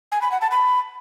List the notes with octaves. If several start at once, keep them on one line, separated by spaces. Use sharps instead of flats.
G#5
B5
F#5
A5
B5